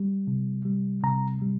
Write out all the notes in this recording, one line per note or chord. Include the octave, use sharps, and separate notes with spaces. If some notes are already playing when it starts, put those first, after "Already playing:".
Already playing: G3
C3
G3
C3 A#5
G3